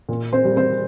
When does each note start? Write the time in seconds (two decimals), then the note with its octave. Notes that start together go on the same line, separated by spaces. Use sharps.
0.09 A#2
0.33 C4 C5
0.45 G3
0.56 C4 C5